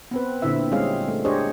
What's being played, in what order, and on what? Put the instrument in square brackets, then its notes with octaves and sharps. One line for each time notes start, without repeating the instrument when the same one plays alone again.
[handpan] B3 C4 B4
A#2 D3 C4 E4 E5
G3 G#3 C4 C#4 G#4 F5
A3
D4 G4 G#4 C5 C#5 D#5